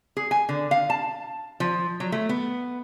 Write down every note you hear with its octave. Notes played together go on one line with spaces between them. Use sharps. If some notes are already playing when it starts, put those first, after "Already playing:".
G#4
G#5
D3
F5
A5
F3
F#3
A3
B3